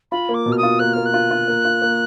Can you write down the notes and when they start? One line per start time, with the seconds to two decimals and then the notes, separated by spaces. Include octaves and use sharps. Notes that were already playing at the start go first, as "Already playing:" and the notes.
0.12 F4 B5
0.29 A#3
0.34 D6
0.46 B2
0.52 F6
0.58 D#6
0.63 F4
0.79 A#3 F#6
0.93 A#3 F6
1.06 F#6
1.14 F4
1.31 F4
1.48 A#3
1.65 F4
1.82 A#3